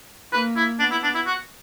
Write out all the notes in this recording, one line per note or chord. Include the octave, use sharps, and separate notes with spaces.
A#3 B4
E4
B3 D4
E4
D4
E4
F#4